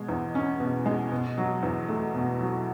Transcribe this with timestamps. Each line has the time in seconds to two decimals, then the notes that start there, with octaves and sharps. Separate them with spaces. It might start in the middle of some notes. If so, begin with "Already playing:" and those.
Already playing: B2 G#3
0.09 E2
0.35 C#4
0.60 B2
0.86 G#3
1.12 B2
1.38 F#3
1.63 E2
1.88 A3
2.15 B2
2.41 F#3